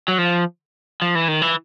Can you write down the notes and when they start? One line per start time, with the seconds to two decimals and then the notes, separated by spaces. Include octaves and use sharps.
0.08 F#3
0.18 F3
1.02 F3
1.15 E3
1.28 D#3
1.42 E3